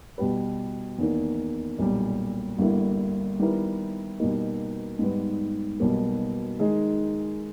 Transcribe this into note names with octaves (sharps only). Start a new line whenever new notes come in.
B2 G3 B3 G4 B4
E2 D#3 A#3
B1 A#2 G3
G1 G2 G3 A#3 E4
D#3 G3 B3 E4 A#4
B2 G3 A#3 D#4
G#2 G3 B3
B1 B2 G3 A#3
D#3 G#3 D#4 G#4